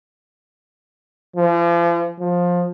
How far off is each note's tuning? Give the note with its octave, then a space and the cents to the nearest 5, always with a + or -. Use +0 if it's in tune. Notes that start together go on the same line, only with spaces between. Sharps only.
F3 -40
F3 +15